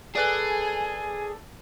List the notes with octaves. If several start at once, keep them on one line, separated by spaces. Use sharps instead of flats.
G#4 A4 B4 D5 G#5